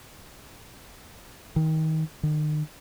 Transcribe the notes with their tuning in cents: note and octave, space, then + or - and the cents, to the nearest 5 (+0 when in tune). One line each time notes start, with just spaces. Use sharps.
D#3 +25
D#3 -40